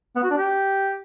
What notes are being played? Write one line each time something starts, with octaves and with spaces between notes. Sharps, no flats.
B3
F#4
D4
G4